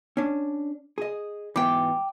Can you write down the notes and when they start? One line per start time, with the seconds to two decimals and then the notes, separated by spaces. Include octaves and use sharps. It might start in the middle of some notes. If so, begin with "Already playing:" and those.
0.17 C#4 D4
0.98 G#4 D#5
1.56 G#2 B2 E3 G5 D6